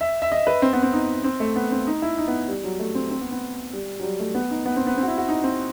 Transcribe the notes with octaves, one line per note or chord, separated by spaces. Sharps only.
E5
E5
D#5
B4
C4
B3
C4
D#4
C4
A3
B3
C4
D#4
E4
D#4
B3
G3
F#3
A3
C4
C4
B3
B3
G3
F#3
G3
A3
B3
D#4
B3
C4
B3
C4
F#4
E4
F#4
D#4
C4